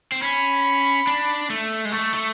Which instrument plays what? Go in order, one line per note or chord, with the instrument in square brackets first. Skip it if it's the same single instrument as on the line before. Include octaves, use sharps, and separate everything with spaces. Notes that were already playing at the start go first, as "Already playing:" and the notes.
[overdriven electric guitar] C4
[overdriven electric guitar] C#4 [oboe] B5
[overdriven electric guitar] D4
A3
G#3
[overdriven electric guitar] A3 [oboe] C#6
[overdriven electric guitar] A3